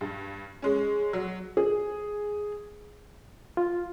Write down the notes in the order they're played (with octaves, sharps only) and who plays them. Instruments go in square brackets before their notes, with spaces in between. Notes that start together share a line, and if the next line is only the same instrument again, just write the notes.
[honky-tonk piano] G2
G#3 C#4
F#3
[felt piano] G#4
[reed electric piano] F4